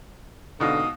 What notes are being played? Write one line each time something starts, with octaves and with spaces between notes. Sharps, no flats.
G#2 B2 D3 F5 D#6